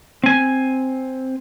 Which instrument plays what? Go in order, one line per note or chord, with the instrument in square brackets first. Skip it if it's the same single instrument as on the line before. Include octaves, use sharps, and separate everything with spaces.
[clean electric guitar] C4 G#5